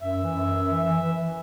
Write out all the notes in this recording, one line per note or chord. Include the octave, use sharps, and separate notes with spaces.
F#2 E5
E3
F#2
F#2
E3
E3
E3
E3